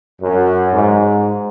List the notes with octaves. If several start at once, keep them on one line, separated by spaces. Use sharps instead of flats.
F#2
G#2